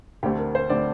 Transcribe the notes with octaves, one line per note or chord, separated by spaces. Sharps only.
D2 D3 A3 C4 G4
A#4
C5
D3 A3 C4 D5